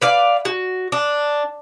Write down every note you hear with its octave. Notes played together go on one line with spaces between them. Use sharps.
B4 D5 F5
F#4
D4